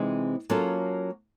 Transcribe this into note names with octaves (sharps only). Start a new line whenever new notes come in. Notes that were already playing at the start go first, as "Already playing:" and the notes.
Already playing: C3 E3 G#3 C4 D#4
F#3 A#3 C#4 F4 A4